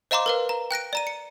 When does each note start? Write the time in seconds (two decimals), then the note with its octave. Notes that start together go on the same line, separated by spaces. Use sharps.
0.11 C5 D#5 F5 A#5 C6 D6
0.26 A#4 B4 F5
0.49 A#5
0.71 G5 F#6 A#6 D7
0.93 D5 A#5 D#7
1.07 C#7